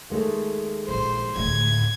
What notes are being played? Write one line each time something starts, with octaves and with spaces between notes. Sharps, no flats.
D#2 G#3 A3
A#1 C5
D2 A2 G#6